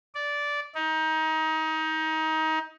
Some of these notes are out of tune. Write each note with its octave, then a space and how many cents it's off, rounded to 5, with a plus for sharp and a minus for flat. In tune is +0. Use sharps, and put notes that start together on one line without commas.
D5 -10
D#4 +25